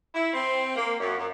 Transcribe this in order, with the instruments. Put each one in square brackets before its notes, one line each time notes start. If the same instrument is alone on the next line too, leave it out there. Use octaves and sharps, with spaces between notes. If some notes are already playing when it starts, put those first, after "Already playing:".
[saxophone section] E4
C4
A#3
F#2
F#2